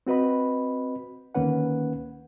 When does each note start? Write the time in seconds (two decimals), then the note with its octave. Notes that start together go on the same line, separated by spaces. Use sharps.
0.07 C4 F#4 B4 D#5 B5
1.35 D2 D#3 A#3 C#4 B4 F#5